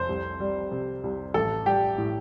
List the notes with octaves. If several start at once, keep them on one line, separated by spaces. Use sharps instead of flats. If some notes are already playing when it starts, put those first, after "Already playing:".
Already playing: F1 C5
C2
G3
C3
C2
A1 A4
G3 G4
A2